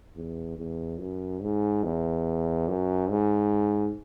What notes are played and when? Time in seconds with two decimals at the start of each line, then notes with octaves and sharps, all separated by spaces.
0.16 E2
0.58 E2
1.00 F#2
1.42 G#2
1.84 E2
2.68 F#2
3.10 G#2